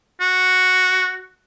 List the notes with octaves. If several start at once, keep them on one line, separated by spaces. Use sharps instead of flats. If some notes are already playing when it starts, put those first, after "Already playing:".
F#4